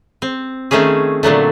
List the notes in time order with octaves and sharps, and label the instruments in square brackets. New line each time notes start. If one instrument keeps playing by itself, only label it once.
[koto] C4
D#3 A3 C4 C#4 G#4
A#2 D3 F#3 A3